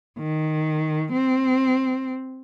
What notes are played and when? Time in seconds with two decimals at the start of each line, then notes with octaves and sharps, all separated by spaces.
0.18 D#3
1.11 C4